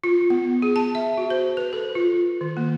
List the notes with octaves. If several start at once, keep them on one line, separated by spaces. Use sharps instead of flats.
F4
B3
G#4
A5
E5
F#4
C5
B4
A4
F4
D#3
A#3